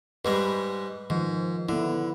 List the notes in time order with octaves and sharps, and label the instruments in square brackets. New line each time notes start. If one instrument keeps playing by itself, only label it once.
[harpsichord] G#2 G3 G#3 [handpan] B4
[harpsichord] G#2 [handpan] D#3 F3
[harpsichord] D3 [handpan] B3 E4